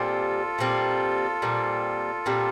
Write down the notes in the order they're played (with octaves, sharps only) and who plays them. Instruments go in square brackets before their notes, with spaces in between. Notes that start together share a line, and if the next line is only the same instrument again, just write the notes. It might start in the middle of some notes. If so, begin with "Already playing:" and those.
Already playing: [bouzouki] A#2 G3 C4 [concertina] F4 A4
[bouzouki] A#2 G3 C4
A#2 G3 C4
A#2 G3 C4